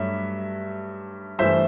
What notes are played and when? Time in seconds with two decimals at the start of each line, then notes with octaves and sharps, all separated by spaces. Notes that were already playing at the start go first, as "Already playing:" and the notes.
Already playing: G2 F#3 A3 E5
1.39 G2 E3 A3 C5 E5